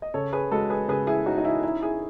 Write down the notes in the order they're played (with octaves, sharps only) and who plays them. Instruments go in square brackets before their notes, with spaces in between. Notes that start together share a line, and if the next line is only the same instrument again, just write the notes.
[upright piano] D#5
C#3 A4 C#5
G#4 B4
G#3 F#4 A4
G#4 B4
C#3 G#4 B4
E4 G#4
C#4 D#4 F#4
D#4
E4
D#4 E4
E4 G#4